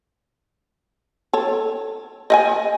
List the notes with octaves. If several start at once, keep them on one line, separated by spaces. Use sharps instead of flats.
A4 C#5
D#5 E5 G#5